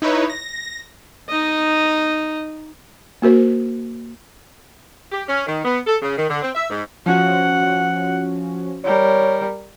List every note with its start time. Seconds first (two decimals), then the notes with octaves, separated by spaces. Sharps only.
0.02 D#4 E4 B4 C#5
0.30 A#6
1.29 D#4 D#5
3.22 A#3 F#4 A#4 C5
5.12 G4
5.28 C#4
5.47 D#3
5.65 B3
5.86 A4
6.02 C#3
6.17 D#3
6.29 D3
6.42 C4
6.54 E5
6.70 G#2
7.06 F3 C#4 F#4 F#5
8.85 G3 A#4 C#5